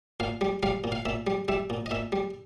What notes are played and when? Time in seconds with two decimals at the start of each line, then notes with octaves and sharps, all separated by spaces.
0.20 A#2 F5
0.41 G3
0.63 G3 F5
0.84 A#2
0.92 F5
1.05 A#2 E5
1.27 G3
1.48 G3 E5
1.70 A#2
1.86 D#5
1.91 A#2 E5
2.12 G3